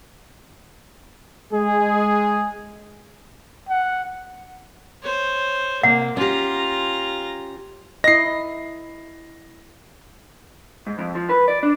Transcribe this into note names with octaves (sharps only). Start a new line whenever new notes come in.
G#3 G#4
F#5
C5 C#5
C3 A#3 F#5
C#4 F4 G4 A#5
E4 D#5 A#6 C7
G#2
F2
F3
B4
D5
D4